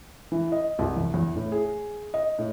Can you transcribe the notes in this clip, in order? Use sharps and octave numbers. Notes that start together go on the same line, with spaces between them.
E3
D#5
C2
E2
E2
A2
G#4
D#5
A2